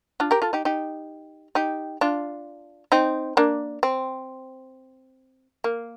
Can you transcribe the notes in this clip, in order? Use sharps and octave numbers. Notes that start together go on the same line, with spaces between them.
D4 F4
G4 A#4
F4 A4
D#4 G4
D#4 G4
D#4 G4
D4 F4
C4 D#4
A#3 D4
C4
A#3